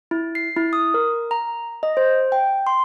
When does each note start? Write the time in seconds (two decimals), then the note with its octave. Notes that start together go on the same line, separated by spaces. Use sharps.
0.11 E4
0.35 C7
0.56 E4
0.73 D#6
0.94 A#4
1.31 A#5
1.83 D#5
1.97 C5
2.32 G5
2.67 C6